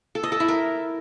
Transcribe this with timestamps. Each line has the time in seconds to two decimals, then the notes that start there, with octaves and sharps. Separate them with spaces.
0.15 A4
0.23 D#5
0.32 A4
0.40 E4
0.48 A#4